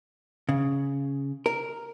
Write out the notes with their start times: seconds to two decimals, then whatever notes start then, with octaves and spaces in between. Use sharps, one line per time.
0.49 C#3
1.46 A#4